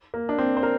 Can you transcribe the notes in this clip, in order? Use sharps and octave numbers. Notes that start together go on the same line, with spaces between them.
A#3
D4
C4
C5
A#4